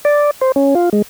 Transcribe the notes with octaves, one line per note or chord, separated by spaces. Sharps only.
D5
C5
C#4
F4
G#3